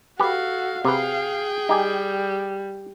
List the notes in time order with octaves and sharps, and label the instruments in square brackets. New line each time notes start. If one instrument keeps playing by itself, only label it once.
[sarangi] F#4 [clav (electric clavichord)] G4 B4 [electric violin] A4 F5
[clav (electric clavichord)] C3 B4 [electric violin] G#4 G5 [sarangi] F5
[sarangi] G3 [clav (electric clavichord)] D#4 G4 G#5